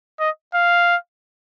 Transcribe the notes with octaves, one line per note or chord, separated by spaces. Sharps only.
D#5
F5